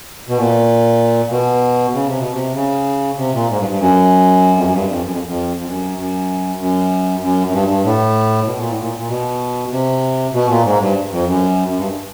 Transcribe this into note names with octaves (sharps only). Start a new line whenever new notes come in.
B2
A#2
B2
C#3
C3
B2
C3
C#3
C3
A#2
G#2
G2
G2
F#2
F2
F#2
G2
F2
F#2
F2
F2
F2
F#2
F#2
F#2
F#2
F#2
G2
G2
A2
B2
A#2
A2
A#2
A#2
B2
C3
B2
A#2
G#2
G2
F2
F#2
F#2
G2